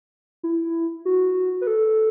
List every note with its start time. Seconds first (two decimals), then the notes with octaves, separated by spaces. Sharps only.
0.43 E4
1.05 F#4
1.61 B4
1.67 A4